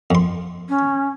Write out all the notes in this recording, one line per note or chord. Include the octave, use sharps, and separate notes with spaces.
F2 C6
C#4